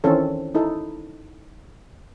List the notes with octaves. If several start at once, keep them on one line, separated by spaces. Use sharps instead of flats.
D#3 E3 C4 C#4 A4
D#4 E4 A4